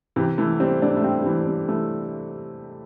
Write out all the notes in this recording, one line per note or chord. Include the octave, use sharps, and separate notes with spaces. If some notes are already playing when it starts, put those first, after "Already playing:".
C3 E3
E3 A3
G3 C4
A3 D4
A3
G3 C4
G3
E3 A3
G3 C4
E3 A3